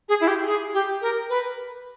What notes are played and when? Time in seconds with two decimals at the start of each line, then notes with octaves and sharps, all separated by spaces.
0.09 G#4
0.21 E4
0.28 G4
0.46 G#4
0.74 G4
1.02 A#4
1.29 B4